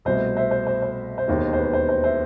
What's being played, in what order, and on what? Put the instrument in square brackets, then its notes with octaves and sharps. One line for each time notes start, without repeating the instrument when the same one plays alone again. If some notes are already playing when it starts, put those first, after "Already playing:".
[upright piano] C2 B2 A3 C5
C5 E5
C5
C5
C5
C5
E1 D#2 D#3
C5
B4
C5
C5
C5 E5